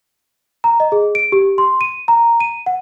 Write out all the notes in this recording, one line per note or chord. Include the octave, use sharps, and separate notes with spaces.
A#5
D#5
G#4
D7
G4
C6
D#7
A#5
D#7
F#5